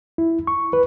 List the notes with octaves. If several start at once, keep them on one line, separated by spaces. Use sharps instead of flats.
E4
C#6
B4